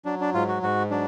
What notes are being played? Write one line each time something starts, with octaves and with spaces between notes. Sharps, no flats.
F#3 D4
D4
G#2 F4
F#4
G#2 F#4
F#3 D4